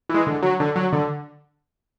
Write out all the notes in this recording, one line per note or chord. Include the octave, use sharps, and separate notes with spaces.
E3 G#3
D3
F#3
D3
F#3
D3